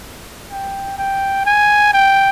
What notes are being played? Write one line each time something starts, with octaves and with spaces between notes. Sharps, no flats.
G5
G5
G#5
G5